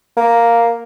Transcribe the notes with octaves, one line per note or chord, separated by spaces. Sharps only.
A#3